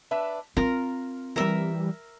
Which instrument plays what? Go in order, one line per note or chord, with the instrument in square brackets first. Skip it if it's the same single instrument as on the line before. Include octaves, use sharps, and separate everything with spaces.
[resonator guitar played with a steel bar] D4 B4 E5
[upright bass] C4 [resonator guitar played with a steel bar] F4 [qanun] A#4
[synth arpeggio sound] E3 G3 [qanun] A#4 E5